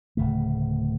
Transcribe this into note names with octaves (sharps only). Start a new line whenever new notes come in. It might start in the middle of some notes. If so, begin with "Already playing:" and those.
D1 C#3 A3